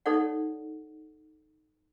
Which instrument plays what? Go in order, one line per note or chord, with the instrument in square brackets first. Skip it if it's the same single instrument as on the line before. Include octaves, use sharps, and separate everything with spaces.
[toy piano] D#4 A4 C#5 D5 F#5